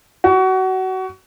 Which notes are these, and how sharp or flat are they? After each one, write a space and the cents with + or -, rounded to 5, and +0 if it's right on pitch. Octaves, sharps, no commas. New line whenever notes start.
F#4 +25